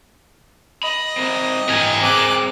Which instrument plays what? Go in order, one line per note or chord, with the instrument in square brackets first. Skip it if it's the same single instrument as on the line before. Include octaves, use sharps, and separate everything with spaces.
[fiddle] D#5 [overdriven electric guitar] B5
[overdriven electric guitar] C4 A#4
[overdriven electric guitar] E3 G4 [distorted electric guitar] A#4 G#5
[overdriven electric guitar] C4 G#4 [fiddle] D6 F#6